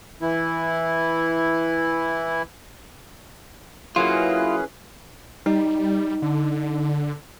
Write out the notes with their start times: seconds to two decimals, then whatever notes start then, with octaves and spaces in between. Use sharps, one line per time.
0.22 E3 E4
3.96 F#3 A#3 C#4 E4 F4 G#4 B4
5.46 G3 D#4
6.22 D3